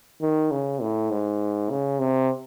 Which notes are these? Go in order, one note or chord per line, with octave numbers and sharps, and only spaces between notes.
D#3
C#3
A2
G#2
C#3
C3